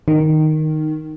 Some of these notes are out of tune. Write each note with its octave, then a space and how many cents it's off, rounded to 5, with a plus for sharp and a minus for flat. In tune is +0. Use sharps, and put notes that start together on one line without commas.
D#3 -5